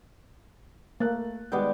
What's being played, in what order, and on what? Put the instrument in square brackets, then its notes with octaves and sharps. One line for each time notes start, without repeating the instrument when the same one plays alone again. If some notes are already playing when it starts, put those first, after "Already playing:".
[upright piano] A3 F#6 A6 [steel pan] A#3
[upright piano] D#3 G3 G#3 [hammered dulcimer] B3 D5 G5